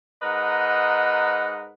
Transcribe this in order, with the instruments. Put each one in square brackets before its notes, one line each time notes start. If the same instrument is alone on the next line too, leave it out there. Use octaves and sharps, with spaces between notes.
[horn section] G#2 A#4 B4 D#5 F#5